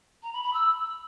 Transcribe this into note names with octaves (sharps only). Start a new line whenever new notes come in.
A#5
B5
B5
E6